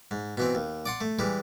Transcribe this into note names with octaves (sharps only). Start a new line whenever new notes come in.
G#2
B2 E3 C4
D#2
D5 F#5 C6
A3
E3 G3 G#3